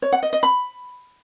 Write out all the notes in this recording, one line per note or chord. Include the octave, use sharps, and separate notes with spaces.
C#5
F#5
D#5
D#5
B5